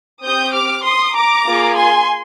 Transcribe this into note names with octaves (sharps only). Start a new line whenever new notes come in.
C4 G4 D#6 G6
D6 F6
C6 D#6
A#5 D6
A#3 F4 G#4
G#5 C6